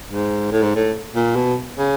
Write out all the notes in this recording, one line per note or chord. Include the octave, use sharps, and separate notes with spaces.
G#2
A2
G#2
A2
A#2
B2
C#3